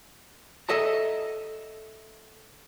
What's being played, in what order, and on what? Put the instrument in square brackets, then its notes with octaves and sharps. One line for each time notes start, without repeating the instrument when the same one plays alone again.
[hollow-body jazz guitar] A4 D#5 E5 A#5